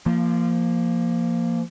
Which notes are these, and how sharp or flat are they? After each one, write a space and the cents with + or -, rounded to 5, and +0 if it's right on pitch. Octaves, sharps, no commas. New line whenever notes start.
F3 -20 A#3 +0